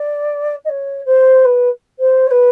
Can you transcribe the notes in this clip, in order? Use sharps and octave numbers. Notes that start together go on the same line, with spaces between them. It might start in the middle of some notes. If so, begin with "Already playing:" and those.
Already playing: D5
D#5
C#5
C5
B4
C5
C#5
B4